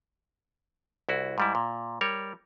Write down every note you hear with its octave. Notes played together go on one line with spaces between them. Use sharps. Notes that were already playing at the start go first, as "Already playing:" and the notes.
C2 E4 F#4
G#2 G3 E4
A#2
G3 A#4 C#5